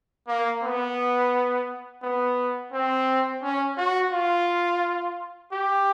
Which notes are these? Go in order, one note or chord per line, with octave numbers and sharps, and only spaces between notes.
A#3
B3
B3
C4
C#4
F#4
F4
G4